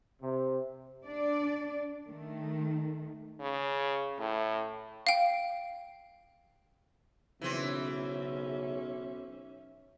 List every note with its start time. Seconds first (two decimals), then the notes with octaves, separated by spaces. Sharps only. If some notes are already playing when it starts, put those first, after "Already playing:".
0.22 C3
1.05 D4 D5
2.08 D#3 A3
3.40 C#3
4.19 A2
5.07 F5 G5
7.41 B1 C#3 E3 C4 C#4 E5